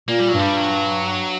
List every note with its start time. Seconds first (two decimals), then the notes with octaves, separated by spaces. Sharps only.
0.08 A#2 A#3
0.19 G3
0.29 G2 F#3
0.39 G3
0.57 F#3